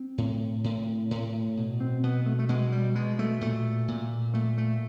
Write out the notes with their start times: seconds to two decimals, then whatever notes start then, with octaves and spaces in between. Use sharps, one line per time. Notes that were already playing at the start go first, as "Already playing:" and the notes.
Already playing: C4
0.18 A2
0.64 A2
1.11 A2
1.57 B2
1.80 C4
2.03 B2 B3
2.26 A3
2.39 A3
2.49 B2 G#3
2.72 G3
2.95 B2 G#3
3.19 A3
3.41 A#2 A3
3.88 A#2
4.34 A#2 A3
4.58 A3